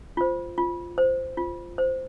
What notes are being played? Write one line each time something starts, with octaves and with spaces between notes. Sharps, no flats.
F4 C5
F4
C5
F4
C5